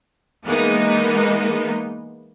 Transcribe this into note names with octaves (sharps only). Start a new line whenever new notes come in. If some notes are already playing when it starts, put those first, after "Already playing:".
E3 G#3 A#3 B3 D#4